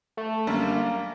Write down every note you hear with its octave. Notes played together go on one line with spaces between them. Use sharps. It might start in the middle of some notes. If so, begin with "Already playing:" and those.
A3
F#2 D3 G3 A#3